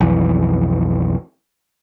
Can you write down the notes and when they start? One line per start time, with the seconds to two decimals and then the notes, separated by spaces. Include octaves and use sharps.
0.01 B1 F2 E3